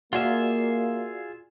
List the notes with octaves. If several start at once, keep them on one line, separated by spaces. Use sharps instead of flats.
A#3 F4 F#4 G#4 D5 E5 F5